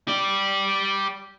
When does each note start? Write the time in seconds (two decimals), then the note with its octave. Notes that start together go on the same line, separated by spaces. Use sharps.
0.08 G4 D5